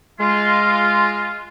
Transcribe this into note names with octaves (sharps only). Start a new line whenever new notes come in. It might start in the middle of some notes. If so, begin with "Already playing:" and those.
G#3 F4